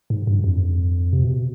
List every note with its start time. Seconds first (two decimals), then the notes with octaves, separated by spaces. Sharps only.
0.10 G#2
0.27 G2
0.44 F2
1.13 C3
1.24 B2